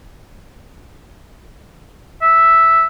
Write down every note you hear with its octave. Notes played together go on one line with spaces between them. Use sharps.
E5